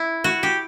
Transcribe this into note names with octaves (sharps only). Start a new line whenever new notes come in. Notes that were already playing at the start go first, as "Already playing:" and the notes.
Already playing: E4
F#4
G4